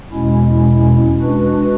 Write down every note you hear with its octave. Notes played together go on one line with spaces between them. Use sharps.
E2 B2 G#3 C#4 E4
G#3 D4 F#4 B4